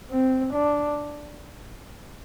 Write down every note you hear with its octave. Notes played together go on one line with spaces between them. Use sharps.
C4
D4